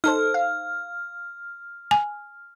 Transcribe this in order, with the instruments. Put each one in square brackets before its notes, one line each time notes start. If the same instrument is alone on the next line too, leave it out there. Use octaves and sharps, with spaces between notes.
[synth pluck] D#4 A4 C5 [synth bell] F6
[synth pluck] F5
[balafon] G#5